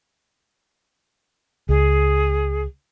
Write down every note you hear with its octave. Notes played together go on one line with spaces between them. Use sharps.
C#2 G#4